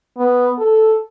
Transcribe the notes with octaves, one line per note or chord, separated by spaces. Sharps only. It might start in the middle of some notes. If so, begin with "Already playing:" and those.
B3
A4